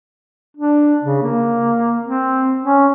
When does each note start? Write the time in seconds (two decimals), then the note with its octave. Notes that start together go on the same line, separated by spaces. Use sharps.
0.57 D4
1.03 C#3
1.22 A#3
2.03 C4
2.63 C#4